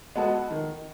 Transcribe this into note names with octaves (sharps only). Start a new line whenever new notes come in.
G#3 B3 F#4 A4
D#3